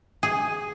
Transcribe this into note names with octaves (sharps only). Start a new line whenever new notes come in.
G#4